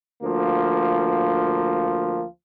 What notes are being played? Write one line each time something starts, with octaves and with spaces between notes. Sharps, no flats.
D2 F3 A#3